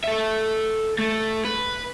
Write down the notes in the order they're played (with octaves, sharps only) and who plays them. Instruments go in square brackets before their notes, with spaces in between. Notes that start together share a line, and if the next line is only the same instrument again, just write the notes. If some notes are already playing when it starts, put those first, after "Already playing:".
[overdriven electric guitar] A4 E5
A3
B4